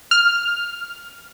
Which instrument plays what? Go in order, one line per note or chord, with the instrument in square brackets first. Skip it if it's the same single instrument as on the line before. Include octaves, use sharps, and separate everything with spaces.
[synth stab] F6